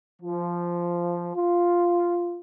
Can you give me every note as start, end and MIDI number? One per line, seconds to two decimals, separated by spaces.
0.21 1.31 53
1.34 2.40 65